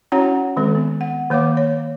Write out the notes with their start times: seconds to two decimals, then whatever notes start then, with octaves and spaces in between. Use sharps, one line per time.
0.12 C#4 E4 F#4 C#5 F#5 A#5
0.57 D#3 G#3 C4 A4
0.75 B3
1.01 F#5
1.30 D#3 A#3 C#5 F5 D6
1.57 C#5